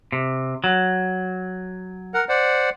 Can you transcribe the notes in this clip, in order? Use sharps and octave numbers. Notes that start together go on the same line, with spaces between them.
C3
F#3
A#4 F#5
C5 D5 F#5